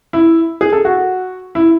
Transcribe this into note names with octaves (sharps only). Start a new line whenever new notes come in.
E4
G#4
A4
F#4
E4